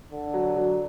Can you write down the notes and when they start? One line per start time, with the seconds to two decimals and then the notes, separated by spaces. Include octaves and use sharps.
0.11 D3
0.34 F#3
0.56 F#3